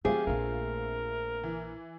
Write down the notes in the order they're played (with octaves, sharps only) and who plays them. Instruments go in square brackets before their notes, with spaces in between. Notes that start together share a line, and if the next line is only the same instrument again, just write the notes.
[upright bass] D#3 F#3 [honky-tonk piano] A3 C4 F4 [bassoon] G4 [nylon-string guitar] G#4
[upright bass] A#1 D4 [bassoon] A#4
[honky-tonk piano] E3